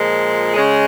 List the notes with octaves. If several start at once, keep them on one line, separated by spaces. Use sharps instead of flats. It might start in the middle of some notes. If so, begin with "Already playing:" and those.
Already playing: A#2 F3 G#3
C#3 G#3